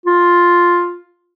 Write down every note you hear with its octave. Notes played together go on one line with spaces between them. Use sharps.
F4